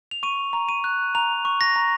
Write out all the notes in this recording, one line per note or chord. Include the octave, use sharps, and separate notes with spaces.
F7
C#6 D#7
A#5
D#7
F#6
A#5 F7
C#6
A#6
A#5